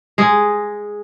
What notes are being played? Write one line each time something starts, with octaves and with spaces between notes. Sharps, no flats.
G#3 G#4